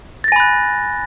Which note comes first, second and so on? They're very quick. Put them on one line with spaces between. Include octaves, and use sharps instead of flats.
A6 A#6 G#5 B5 F#6